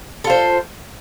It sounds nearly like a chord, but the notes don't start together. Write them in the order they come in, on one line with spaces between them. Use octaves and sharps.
A4 F4 C5